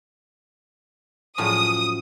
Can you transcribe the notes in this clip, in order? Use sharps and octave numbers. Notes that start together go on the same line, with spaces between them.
F#2 A2 F3 D#6